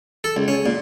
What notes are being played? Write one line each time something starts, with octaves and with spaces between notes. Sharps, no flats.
A4
C#2
C#4
A#2